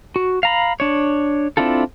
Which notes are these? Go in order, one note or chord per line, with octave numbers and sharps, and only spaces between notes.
F#4
F5 A#5 B5
D4 C#5
C4 D4 E4 F4 A4